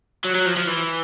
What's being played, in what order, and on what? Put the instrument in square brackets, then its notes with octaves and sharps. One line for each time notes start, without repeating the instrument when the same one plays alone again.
[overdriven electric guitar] F#3
F#3
F3
F3
E3